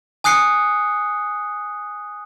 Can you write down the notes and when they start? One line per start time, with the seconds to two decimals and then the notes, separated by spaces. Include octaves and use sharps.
0.24 G#5 D#6 F#6 C7 C#7